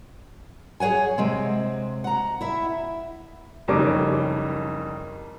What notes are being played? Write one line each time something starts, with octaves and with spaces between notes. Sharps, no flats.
G#4 C#5 F#5 G#5
C3 G#3 C4
F#5 A#5
E4 E5
F#1 F2 D#3 G3 C#4 D6